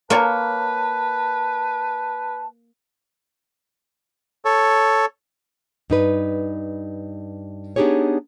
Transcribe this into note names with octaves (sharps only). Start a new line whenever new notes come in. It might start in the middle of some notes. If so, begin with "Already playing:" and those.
A#3 A#4 B4 C#5 D5 A5 A#5
A4 C#5
G2 D#4 B4
B3 D4 D#4 G4 G#4 C#5